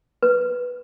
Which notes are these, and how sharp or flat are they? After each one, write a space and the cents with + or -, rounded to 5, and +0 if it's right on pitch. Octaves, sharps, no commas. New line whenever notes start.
B4 -5